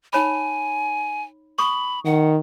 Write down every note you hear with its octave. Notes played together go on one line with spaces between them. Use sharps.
D#4 C#5 G#5 B5
B5 C#6 D#6
D#3 F#5